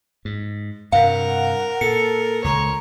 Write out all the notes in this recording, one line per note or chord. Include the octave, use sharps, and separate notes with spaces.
G#2
G2 C3 A#4 F5 F#5
A#2 A4 C#7
C#2 C#5 A#5